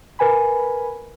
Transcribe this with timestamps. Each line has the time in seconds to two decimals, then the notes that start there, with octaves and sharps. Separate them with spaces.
0.19 A#4 B4 G#5 B5